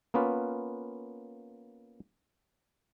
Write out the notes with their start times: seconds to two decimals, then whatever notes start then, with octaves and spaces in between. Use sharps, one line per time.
0.14 A#3 B3 C#4 F4 B4